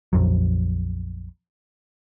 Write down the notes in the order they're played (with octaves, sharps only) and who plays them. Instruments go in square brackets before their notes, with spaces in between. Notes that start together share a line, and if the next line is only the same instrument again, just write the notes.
[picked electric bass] A#1 F2 F#3